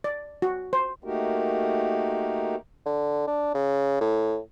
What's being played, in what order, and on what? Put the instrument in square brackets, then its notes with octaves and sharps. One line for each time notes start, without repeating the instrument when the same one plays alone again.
[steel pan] D5
F#4
C5
[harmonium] A3 A#3 D#4 F#4 G4 A#4
[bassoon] D3
D4
C#3
A2